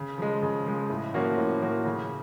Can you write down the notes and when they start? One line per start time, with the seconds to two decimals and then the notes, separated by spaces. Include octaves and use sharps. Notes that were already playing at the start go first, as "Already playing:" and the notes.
Already playing: C#3
0.18 F3 G#3
0.42 C#3
0.66 F3 G#3
0.90 A2
1.14 F3 A#3 C#4 F#4
1.38 A2
1.62 F3 A#3 C#4 F#4
1.85 C#3